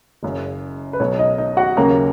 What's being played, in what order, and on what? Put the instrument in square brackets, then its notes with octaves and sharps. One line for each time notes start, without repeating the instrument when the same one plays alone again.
[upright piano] F#1 F#2 C#3
B4
B1 B2 F#3 B3 C#5
D#4 D#5
D#4 D#5
F#4 F#5
D#2 C#3 F#3 A#3 A#4 A#5